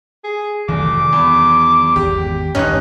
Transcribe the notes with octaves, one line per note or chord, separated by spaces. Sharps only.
G#4
F1 D#3 E3 F#3 D6
E2
G#1 E2 G4
G#1 D2 G2 C#4 D#4 F#6